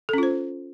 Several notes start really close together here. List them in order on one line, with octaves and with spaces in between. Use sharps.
A4 C#4 F4 C5